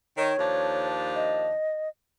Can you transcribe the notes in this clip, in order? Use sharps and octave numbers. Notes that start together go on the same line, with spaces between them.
D#3 C#5
D#2 F3 D4
D#5